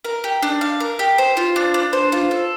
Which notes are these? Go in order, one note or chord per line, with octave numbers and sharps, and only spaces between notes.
A#4
G4
D4
F5
A#4
G4
C5
F4
D4
D4
C5
F4
A4